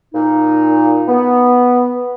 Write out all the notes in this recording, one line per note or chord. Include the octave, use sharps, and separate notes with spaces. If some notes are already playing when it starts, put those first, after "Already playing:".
A#2 D#4
B3